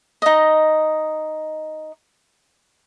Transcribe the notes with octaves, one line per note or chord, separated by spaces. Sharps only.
D#4 D#5